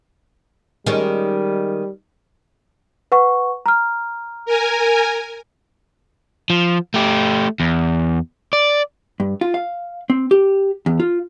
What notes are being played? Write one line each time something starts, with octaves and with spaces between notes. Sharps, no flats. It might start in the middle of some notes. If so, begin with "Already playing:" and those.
D#3 G3 G#3 C#4
B4 F#5 C#6
A#5 F6
A#4 G#5
F3
A3 G4
E2
D5
G2
F4
F5
C4
G4
E2
F4